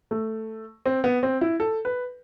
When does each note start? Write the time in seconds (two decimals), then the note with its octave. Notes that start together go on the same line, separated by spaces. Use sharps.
0.11 A3
0.86 C4
1.04 B3
1.23 C4
1.41 E4
1.60 A4
1.85 B4